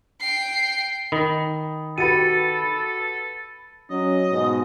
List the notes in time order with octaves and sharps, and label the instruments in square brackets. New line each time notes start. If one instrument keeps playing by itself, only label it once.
[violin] G5 C7
[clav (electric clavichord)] D#3 [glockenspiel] B5 [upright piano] D#6
[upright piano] F#4 G4 B4 [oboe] A4 [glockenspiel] A6 C#7 D#7
[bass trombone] F#3 [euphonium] C#4 [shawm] D#5
[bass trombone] G#2 [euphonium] B2